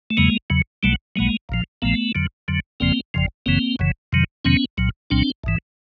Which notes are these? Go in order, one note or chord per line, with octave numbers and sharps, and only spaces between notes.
A3
E2 C#3 F#3 G#3 A#3
E2 C#3 F#3
B1 B2 F#3 G3 A3
B1 B2 F#3 G#3 A#3
A#1 A#2 F3
A#1 A#2 F3 A3 B3
F2 D3 F#3
F2 D3 F#3
G1 F2 C#3 F3 A#3 C4
G1 F2 C#3 F3
F#1 F#2 C#3 E3 A#3 C4
F#1 F#2 C#3 E3
F2 C3 D#3 F#3
F2 C3 D#3 F#3 B3 C#4
C2 A#2 F#3
C2 A#2 F#3 C4 D4
A1 G#2 E3